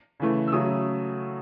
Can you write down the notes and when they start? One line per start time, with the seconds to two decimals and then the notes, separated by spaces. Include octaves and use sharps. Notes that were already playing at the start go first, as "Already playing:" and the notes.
0.20 C#3 E3 A3
0.47 E6
0.52 C#3 F#3 A3 D#6